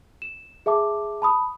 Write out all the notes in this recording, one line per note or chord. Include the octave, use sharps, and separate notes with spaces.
E7
G#4 E5 A5 D6
A5 B5 D#6